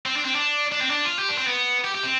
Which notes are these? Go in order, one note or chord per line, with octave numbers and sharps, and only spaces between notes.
C4
D4
C4
D4
D4
C4
D4
F4
G4
D4
C4
B3
G4
G4
C4